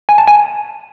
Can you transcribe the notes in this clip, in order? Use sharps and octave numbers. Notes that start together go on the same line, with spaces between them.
G#5
A5
G#5